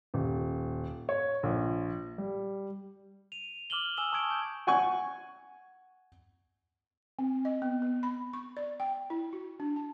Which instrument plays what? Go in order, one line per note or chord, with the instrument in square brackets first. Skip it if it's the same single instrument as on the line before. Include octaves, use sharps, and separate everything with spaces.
[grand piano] D#1
C#5
A#1
G3
[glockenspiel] D#7 F7
D6 F6 E7 F#7 G7
G#5 D#6 E6 E7 G7
A5 C#6 D#6 G#6 D7 G7
G6 G#6 D7
[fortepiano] F#5 G#5 C#6
[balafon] C4
D#5
B3
B3
B5
C#6
D5
G5
E4
F#4
D4
A5